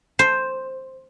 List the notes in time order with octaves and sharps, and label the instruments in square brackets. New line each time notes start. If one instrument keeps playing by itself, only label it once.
[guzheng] C5